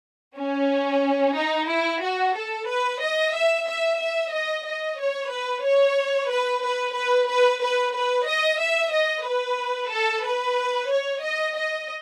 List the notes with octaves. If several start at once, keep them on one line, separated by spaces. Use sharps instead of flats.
C#4
D#4
E4
F#4
A4
B4
D#5
E5
E5
E5
D#5
D#5
C#5
B4
C#5
B4
B4
B4
B4
B4
B4
D#5
E5
D#5
B4
A4
B4
C#5
D#5
D#5